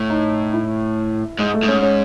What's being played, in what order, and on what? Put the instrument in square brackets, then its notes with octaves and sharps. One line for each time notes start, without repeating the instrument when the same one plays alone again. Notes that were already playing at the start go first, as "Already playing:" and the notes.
Already playing: [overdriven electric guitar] A2
[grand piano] D#4
E4
[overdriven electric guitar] G#2 [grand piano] G#3
[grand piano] A3
[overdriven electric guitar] G#2
[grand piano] C#4
C#4